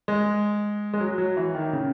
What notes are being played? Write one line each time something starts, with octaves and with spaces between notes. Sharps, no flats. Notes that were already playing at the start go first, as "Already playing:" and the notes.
G#3
G#3
F#3
F#3
E3
D#3
C#3